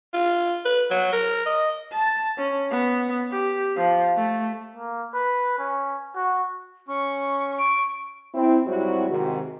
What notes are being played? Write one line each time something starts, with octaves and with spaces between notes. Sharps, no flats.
F4
B4
F#3
A#4
D#5
A5
C#4
B3
G4
F3
A3
A#3
B4
C#4
F#4
C#4 C#6
C#6 D7
C4 E4
G#2 F#3 G3 C4 E4 F#4
G#2 C3 D#3 F#4